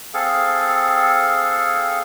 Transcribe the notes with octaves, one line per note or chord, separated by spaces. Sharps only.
C4 G#4 A4 F5